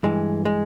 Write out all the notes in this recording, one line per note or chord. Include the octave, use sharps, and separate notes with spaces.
G2 E3 G#3
G#3